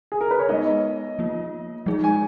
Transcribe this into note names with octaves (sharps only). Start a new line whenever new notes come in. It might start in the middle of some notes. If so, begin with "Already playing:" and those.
G#4
A#4
B4
C#5
G#3 B3 D#4 D#5
F3 A#3 F4
F3 G#3 D#4 G#4
G#5